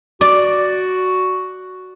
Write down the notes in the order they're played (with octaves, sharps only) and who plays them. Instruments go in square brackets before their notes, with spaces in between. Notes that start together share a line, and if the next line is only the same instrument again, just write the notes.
[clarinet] F#4 [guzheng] D5